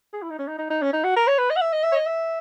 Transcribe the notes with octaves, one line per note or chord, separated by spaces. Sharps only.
G#4
E4
D#4
C#4
D#4
D#4
D#4
C#4
D#4
F#4
A#4
C#5
B4
D#5
F#5
E5
D#5
E5
C#5
D#5
E5